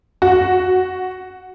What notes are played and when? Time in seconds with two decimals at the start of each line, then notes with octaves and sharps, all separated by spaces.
0.22 F#4